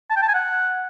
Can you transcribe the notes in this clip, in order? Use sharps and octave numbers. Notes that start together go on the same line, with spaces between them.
A5
G5
A5
G#5
F#5